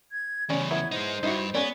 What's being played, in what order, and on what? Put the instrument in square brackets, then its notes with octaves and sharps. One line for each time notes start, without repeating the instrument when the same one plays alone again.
[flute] G#6
[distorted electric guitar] E2 C#3 [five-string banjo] C#4 D5 [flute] G#5
[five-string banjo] F#3 B3 E4 [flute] G#6
[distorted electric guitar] G#3 D#4 [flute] C5
[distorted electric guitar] G2 [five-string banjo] D#4 E4 F#4
[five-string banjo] G#3 C#4 D5 [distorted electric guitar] B3